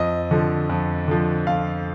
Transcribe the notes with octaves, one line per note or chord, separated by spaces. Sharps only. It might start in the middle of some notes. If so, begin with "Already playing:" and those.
Already playing: F2 D#5
D3 F3
F2
D3 F3
F2 F5